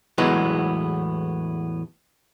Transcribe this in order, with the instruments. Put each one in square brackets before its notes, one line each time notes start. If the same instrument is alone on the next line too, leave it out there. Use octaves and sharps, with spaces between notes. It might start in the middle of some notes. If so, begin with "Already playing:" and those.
[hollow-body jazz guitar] E2 A2 E3 F#3 G#3 B3